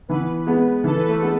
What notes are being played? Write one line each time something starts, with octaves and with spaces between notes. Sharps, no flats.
E3 B3 B4
G#3 B3
E3 A4
B4
A3 A4
G#3 B3